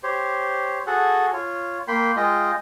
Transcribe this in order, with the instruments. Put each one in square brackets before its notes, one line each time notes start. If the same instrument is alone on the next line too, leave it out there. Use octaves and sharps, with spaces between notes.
[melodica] G4 C5 C#5
F#4 G#4 A4 F#5
F4 C#5
A#3 G5 B5 C6
G#3 F4 D#5 G5